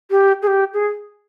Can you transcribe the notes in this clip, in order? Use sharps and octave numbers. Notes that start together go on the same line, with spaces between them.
G4
G#4
G4
G#4